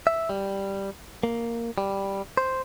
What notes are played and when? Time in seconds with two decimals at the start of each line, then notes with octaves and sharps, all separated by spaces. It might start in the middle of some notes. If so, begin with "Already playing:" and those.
0.07 E5
0.29 G3
1.23 A#3
1.78 G3
2.37 C5